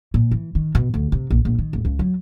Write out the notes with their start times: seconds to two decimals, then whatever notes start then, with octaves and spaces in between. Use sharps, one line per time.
0.14 A#2
0.31 E3
0.55 D#3
0.75 B2
0.94 D2
1.12 C3
1.30 A#1
1.45 A#1
1.59 D#3
1.73 D#1
1.85 C#2
1.99 F#3